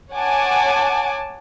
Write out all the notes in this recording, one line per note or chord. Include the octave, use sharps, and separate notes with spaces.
C#5 F#5 G#5 A5 D6